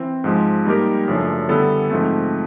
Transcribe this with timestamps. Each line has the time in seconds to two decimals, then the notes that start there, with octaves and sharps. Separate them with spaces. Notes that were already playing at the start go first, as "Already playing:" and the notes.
Already playing: E3 C4
0.24 G#2 F3 G#3
0.65 G3 A#3 D#4 G4 A#4
1.08 F#2 C#3 F3 A3 D4
1.49 D3 G3 B3 E4 A4
1.90 G#2 F3 A3 C4